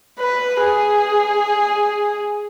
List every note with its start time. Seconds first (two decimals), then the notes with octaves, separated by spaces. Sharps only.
0.20 B4
0.62 G#4